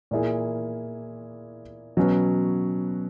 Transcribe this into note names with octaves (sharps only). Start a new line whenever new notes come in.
A#2 A#3 E4 G#4
B2 F#3 C#4 F#4 B4